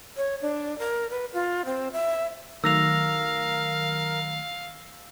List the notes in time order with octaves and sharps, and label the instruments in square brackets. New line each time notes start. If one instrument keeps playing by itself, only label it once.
[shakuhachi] C#5
D4
A#4
B4
F4
C4
E5
[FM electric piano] D#3 F#3 A3 [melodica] A#4 [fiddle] F5 [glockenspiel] E6 A#6 F7